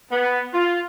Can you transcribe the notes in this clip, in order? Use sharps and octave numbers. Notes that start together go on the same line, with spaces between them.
B3
F4